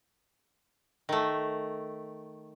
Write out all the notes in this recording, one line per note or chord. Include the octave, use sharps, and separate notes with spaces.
D#3 A3